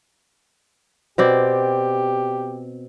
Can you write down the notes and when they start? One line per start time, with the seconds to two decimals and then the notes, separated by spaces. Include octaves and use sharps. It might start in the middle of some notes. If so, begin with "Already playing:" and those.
1.18 B2 C4 G4 D5